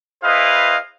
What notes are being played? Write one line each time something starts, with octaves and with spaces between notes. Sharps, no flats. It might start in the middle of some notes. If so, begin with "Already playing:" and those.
E4 G#4 B4 C5 D#5 F5